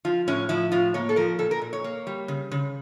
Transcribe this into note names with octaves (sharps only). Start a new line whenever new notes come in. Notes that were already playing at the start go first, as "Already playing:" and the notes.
F3 F4
A2 C#4
F3 E4
A2 F4
A#3 C#5
A4
F3 A#4
A#2 A4
A#4
A#2
C#5
A#3
G3
C#3
C#3